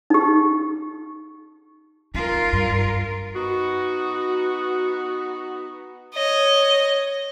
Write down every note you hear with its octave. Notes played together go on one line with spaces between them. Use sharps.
D#4 G4
D#4 F4 A#4
G2
B3 D#4 F#4
C#5 D#5